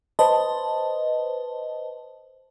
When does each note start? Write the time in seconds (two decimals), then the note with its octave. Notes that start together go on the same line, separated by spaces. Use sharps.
0.19 B4 C5 D#5 A5